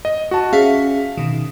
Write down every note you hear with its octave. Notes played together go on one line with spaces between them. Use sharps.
D#5
F#4 A5
C#4 G#4 E5 F5 B6
B2 D#3